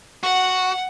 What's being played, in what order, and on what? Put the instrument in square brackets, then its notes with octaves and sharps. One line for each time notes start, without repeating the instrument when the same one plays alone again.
[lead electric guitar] F#4 [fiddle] F#5